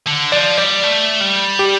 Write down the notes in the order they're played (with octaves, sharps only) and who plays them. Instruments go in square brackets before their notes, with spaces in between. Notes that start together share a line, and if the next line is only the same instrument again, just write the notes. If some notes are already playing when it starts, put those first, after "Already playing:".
[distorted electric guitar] D3
[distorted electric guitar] F3 [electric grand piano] D5
[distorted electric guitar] G3 [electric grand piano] D5
[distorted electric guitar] A3
G3
[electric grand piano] G4